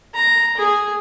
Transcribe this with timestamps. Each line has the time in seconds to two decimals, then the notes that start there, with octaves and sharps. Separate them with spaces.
0.14 A#5
0.57 G#4